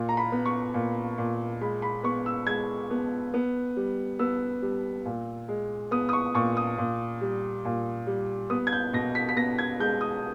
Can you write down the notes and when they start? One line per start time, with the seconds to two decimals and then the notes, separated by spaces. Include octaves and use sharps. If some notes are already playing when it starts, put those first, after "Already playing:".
Already playing: A#2
0.09 A#5
0.17 B5
0.32 B3
0.46 C#6
0.74 A#2
1.18 A#2
1.61 G#3 B5
1.82 B5
2.03 B3 C#6
2.26 E6
2.47 G#3 G#6
2.90 B3
3.34 B3
3.77 G3
4.19 B3 E6
4.62 G3
5.05 A#2
5.48 G#3
5.91 B3 D#6
6.09 D#6
6.13 C#6
6.34 A#2 C#6
6.57 D#6
6.78 A#2
7.21 G3
7.65 A#2
8.07 G3
8.50 B3 D#6
8.67 G#6
8.73 G6
8.93 B2 A#6
9.15 B6
9.29 B6
9.36 B3 A#6
9.59 G#6
9.79 G#3 G6
10.01 D#6